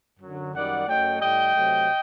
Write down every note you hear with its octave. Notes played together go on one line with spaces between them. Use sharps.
F#2 D3 F#3
F#2 D#3 G3 D5 F#5
F#2 F#3 A3 D#5 G5
A2 G3 D#5 G5
C3 F#3 A3